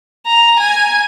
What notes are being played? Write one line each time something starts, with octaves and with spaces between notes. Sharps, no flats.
A#5
G#5